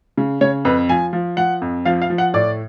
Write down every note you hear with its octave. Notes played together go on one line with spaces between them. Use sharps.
C#3
C#3 C#5
F2 B4
F3 G#5
F3
F3 F#5
F2
F3 F5
F5
F3
F#5
A2 D5